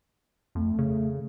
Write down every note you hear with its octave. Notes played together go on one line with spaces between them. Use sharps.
F2 A3
C#3